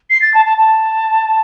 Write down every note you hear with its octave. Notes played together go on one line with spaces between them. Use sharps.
C7
A6
A5
A5
A5